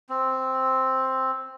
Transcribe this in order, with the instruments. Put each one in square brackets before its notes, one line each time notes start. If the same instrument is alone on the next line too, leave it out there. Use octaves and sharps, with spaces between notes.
[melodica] C4